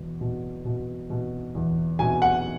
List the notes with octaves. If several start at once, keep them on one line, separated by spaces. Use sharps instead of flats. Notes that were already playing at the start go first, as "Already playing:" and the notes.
Already playing: E2 B2
B2
B2
B2
E2
B2 G#5
F#5